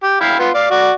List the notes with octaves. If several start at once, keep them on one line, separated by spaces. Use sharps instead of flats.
G4
E4 F5 G5
B3 F4
D5 F5
F#4 D5